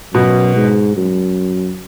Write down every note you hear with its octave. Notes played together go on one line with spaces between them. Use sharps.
F#2 B2
G#2
F#2